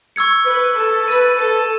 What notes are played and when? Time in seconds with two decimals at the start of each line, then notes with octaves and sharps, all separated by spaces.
0.16 C#6 E6 G#6 C#7
0.47 B4
0.77 A4
1.08 B4 E6 A6 D#7
1.39 A4